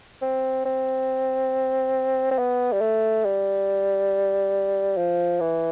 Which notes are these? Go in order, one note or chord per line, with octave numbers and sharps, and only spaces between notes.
C4
C4
C4
B3
G3
A3
G3
F3
E3